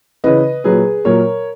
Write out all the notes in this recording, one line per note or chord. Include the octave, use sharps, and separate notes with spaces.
C#3 E3 B4 D#5
A#2 F#3 G#4 B4
A#2 F#3 A#4 C#5